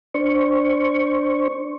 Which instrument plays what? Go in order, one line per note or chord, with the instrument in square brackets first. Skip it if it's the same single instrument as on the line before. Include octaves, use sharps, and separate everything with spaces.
[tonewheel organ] D4 C5 C#6